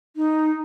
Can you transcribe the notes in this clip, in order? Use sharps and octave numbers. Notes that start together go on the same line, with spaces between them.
D#4